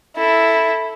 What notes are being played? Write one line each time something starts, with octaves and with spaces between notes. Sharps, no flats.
E4 A4